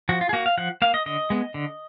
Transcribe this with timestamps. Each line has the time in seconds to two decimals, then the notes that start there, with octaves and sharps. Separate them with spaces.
0.09 F3 F#4
0.21 F4
0.29 G#4
0.33 A#3 F#4
0.46 F5
0.58 F3 F#5
0.82 A#3 F5
0.94 D#5
1.06 D3 D#5
1.30 G#3 B3
1.54 D3